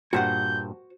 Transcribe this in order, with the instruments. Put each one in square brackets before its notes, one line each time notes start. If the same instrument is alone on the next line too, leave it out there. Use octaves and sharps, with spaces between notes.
[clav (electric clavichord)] G2 A#2 [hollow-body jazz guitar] F#4 C5 F#5 [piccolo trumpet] G6